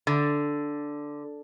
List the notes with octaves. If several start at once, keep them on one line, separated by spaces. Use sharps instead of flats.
D3